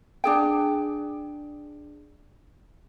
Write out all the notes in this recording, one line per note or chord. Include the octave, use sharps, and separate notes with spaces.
D4 G#4 G5